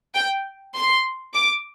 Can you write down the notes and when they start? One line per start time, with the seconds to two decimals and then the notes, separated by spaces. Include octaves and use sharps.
0.14 G5
0.75 C6
1.34 D6